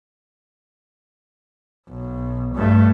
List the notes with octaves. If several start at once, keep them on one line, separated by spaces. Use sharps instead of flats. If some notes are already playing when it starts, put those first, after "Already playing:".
B1
G2 A3